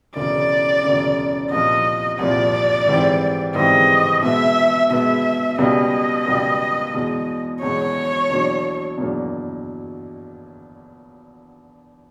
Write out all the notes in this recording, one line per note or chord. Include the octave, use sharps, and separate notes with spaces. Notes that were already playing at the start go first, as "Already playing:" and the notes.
E1 D2 C#3 D5
E1 D2 C#3
C2 A#2 F3 D#5
C2 A#2 F3 D5
G#2 E3 G3 C4
G#2 E3 G3 C4 D#5
B2 G#3 B3 E5
B2 G#3 B3 E5
C#2 B2 G3 B3 D#5
C#2 B2 G3 B3
E2 B2 G#3
E2 B2 G#3 C#5
E2 B2 F#3 A#3 D4
E2 B2 F#3 A#3 D4